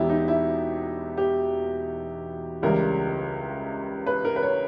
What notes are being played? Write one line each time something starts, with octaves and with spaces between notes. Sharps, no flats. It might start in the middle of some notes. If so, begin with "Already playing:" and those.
Already playing: E1 E2 B2 E4 G4
D#4
E4
G4
C#2 C#3 E3 G3 A#4
B4
A#4
B4
C#5